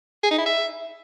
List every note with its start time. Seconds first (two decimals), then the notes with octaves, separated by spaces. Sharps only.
0.23 G#4
0.31 D#4
0.38 E4
0.46 E5